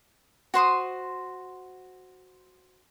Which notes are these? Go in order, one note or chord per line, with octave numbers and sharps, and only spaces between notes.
F#4 C5 C6 D#6